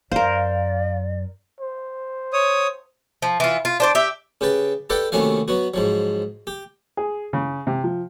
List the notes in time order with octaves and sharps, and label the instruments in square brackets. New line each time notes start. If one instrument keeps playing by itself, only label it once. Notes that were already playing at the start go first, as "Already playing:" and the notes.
[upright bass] F#2 [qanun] A#4 C5 [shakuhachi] D5 [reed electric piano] F5
[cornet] C5
[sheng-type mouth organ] C#5 D#6
[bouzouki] F3
E3 F4
F4
D4 C5 D5
G4 E5
[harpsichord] C#3 G4 B4 A5
G4 A4 B4 D5 F#5 G5
D#2 C3 A3 C#4 F#4 F5
F#3 B3 F#4
G#2 F3 F#3
G4
[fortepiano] G#4
C#3
C3
F3